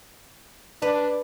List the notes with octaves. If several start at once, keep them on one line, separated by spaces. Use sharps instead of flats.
D4 B4